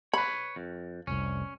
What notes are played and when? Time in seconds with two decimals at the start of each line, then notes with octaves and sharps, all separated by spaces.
0.14 B4 C#5 B5
0.56 F2
1.07 F1 C2 C#4